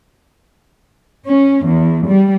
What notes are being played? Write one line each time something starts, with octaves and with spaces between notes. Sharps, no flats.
C#4
E2
G3